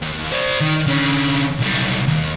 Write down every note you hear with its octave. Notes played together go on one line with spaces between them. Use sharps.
D#2
C5 D5
D#3
D3 C#4
B1 G3
D#2